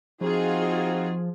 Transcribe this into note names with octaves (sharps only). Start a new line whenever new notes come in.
F3 C4 D#4 F4 F#4 G#4